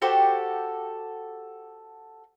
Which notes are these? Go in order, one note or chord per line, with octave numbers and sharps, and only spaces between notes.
F#4 G4 A4 C5